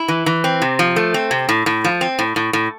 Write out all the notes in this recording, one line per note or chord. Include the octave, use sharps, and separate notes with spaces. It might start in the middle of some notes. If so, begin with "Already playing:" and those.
Already playing: E4
E3
E3
C4
C3
F3
A3
C4
C3
A2
A2
F3
C4
A2
A2
A2